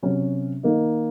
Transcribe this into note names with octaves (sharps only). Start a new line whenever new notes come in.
C3 F#3 C#4 F#4
D#3 A#3 D#4